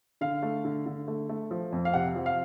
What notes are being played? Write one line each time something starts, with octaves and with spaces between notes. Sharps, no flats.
D3 F5
A3
D3
D3
A3
A3
F3
F2
F5
C3 F#5
F3
F5